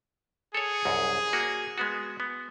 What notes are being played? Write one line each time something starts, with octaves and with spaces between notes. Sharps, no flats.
G#4 A4 C#5
C2 F#2
A#3 F#4
G#3 B3 F#4
B3